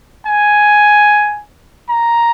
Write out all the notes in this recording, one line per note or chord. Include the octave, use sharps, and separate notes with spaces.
G#5
A#5